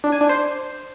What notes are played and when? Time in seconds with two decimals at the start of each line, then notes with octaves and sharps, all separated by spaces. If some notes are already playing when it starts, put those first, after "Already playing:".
0.04 D4
0.12 G#5
0.21 D4
0.29 C5